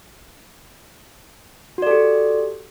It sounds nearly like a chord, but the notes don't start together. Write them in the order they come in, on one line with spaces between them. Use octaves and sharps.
F#4 D5 A4 G4